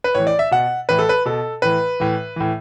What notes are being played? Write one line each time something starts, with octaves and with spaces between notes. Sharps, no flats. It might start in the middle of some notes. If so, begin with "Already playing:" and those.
B4
A2 E3 C#5
D5
E5
B2 F#5
A2 E3 B4
A4
B4
B2 A4
A2 E3 B4
A2 E3
A2 E3